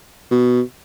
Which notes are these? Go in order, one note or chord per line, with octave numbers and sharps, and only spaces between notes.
B2